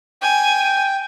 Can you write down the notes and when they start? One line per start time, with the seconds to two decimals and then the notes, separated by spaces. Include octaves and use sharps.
0.22 G5 G#5